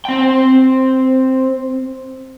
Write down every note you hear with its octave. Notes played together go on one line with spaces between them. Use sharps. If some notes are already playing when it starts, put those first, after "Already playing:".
C4 G5